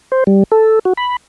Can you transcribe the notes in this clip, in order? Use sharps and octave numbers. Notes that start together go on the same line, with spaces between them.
C5
G3
A4
F#4
B5